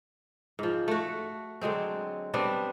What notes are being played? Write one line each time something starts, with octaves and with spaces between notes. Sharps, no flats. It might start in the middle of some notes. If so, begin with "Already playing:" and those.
G#2 F3
A3 F#4
D3 F#3 G#3 C4
G3 B3 C4 D4